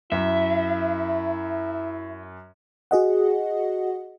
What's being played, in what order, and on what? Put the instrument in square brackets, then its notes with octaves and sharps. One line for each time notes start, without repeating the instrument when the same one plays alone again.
[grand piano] F#2 [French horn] E4 [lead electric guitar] E5
[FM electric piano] F#4 G#4 D#5 F#5